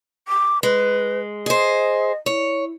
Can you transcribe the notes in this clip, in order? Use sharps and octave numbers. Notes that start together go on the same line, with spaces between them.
D6
G#3 B4
G#4 C5 D#5
E4 C#5